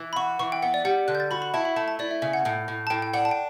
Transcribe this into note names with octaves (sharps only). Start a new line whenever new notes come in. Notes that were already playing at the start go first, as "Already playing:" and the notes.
Already playing: E3
B5
F#4 C#6
E3 C#6
G5
B3 F#5
D5
G3 F#5
D3 F#6
G6
A6
F#4 B5
B5
E4 A5
B5
A3 A5
A5
E4 D5
E5
C#3 E5
F#5
A2
A2
A5
A2 G5
G5
D4 F#5
A5
G5